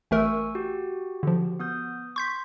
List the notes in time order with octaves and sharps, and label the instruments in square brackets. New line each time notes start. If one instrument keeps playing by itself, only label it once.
[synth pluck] A1 A3 A#4 [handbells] G#5 C#6 E6
[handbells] F#4 G4
[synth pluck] D3 F3
[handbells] B3 D#6 G6
[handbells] C6 [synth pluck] C#6 G6 B6